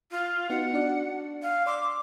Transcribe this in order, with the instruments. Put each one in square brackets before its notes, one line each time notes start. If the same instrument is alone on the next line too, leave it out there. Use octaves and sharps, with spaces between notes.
[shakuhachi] F4
[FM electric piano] B3 D#4 F#4 [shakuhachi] F#5
[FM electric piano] D4 F#4 D5
[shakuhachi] F5
[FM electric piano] D5 C6 E6 [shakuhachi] D6